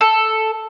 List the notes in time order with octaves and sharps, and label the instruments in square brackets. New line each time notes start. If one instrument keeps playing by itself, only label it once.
[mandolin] A4